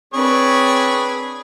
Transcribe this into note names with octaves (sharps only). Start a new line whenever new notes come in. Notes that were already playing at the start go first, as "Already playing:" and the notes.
C4 D4 G#4 B4 C#5